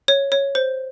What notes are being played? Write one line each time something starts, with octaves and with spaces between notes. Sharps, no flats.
C#5
C#5
C5